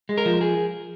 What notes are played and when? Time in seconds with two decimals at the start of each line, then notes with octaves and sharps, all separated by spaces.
0.09 G#3
0.18 A#4
0.25 F3
0.41 G#4